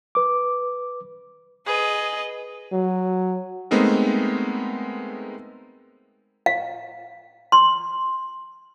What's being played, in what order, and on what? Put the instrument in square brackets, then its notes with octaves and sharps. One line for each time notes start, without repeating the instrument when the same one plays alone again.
[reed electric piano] B4 D6
[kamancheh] G#4 [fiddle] B4 D#5
[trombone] F#3
[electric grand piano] G#3 A3 B3 C4 D#4 A#4
[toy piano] F5
C6